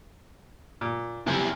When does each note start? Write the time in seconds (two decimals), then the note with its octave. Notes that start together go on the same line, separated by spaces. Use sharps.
0.81 A#2
1.27 C3 G3 E4 G#4